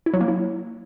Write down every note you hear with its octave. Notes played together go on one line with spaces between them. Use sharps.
E4
F#3
A#3
E4